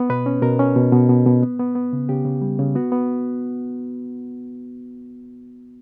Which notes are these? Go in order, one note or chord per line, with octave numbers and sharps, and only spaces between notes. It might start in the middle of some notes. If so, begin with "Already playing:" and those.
Already playing: B3
B2 B4
C#4
B2 A#4
C#4
B2
B2
B2
B2
B3
B3
B3
C#3
C#3 G4
C#3
G3
C#3
B3 F#4
B3